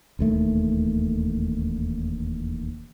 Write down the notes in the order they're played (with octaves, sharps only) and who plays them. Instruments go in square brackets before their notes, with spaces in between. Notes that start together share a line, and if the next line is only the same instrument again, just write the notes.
[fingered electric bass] E1 D#2 A3